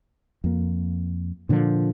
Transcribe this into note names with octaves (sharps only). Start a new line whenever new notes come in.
F2 A#3
A#2 D3 D#3 F3